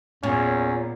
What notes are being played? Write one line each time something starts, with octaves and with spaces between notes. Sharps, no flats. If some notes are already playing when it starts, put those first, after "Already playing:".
E2 A#2 C#4